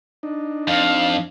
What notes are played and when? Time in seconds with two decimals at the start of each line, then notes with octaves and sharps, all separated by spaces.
0.23 D4 D#4
0.67 F2 F5